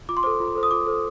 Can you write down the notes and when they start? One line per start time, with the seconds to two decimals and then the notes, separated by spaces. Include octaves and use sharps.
0.09 F4 D6
0.17 C6
0.23 A4 C5 D6
0.40 F4
0.55 A4 C5
0.63 D#6
0.71 F4 D6
0.87 A4 C5